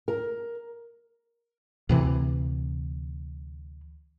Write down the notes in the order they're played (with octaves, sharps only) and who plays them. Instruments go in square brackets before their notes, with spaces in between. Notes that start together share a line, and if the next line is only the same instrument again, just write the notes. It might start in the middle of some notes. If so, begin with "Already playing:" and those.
[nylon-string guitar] A#4
[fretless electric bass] D2 C3 E3